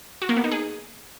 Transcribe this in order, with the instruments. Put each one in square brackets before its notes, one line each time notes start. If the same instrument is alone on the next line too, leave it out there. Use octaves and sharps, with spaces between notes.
[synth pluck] F#4
A#3
B3
D#4
G#4